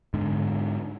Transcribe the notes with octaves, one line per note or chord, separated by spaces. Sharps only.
G#2 D3